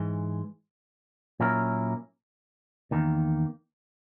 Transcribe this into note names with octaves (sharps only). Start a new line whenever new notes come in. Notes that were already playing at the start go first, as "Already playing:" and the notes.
Already playing: G#2 E3 G#3
A#2 F#3 C#4 E4 A#4
E2 D#3 A#3